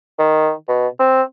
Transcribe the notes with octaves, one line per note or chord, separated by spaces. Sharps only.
D#3
B2
C4